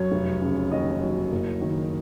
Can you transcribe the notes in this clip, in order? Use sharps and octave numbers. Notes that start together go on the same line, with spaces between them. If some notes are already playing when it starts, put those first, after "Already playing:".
Already playing: F#2 F#3 C#5
F1
C#3
D#2 D#5
F#3
F#1
D#3